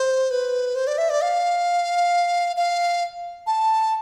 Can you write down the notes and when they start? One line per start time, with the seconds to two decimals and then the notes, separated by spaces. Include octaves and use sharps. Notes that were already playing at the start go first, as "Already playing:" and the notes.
Already playing: C5
0.31 B4
0.75 C5
0.87 D5
0.98 E5
1.10 D5
1.21 F5
2.56 F5
3.47 A5